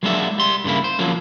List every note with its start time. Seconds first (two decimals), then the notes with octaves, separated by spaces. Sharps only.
0.03 F#3 G#3 A#3 D4 F#4 E5
0.38 G3 C6
0.64 G2 C#3 A#3 E4
0.84 C5
0.99 F3 F#3 A#3 C#4